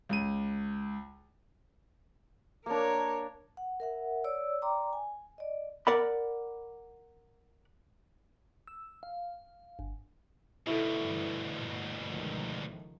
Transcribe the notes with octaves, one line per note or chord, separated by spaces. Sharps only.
C#2 D#7
A#3 D4 A#4 C#5
F#5
A#4 E5 F#5
C#5 D5 E6
D5 G5 A#5 C6 D6
G#5
D5 D#5
A#4 D5 F#5 B5
E6
F5
G1
D2 B2 E4 A4
G2 E3
G2 A#2
C#2 D#3 F3